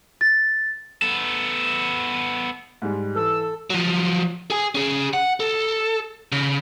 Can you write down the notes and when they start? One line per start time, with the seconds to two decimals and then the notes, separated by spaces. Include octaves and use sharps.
0.21 A6
1.02 B3 A4
2.82 G#2 G3 G#3
3.15 E3 A4 E6
3.70 F3 F#3
4.50 G#4 G#5
4.75 C#4 G#4
5.14 F#5
5.40 A4
6.32 C#3